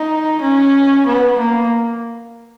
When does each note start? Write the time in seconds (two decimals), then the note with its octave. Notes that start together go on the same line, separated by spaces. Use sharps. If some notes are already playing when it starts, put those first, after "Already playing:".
Already playing: D#4
0.42 C#4
1.07 B3
1.39 A#3